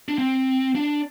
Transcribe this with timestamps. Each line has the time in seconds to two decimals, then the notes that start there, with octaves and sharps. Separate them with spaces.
0.08 D4
0.18 C4
0.75 D4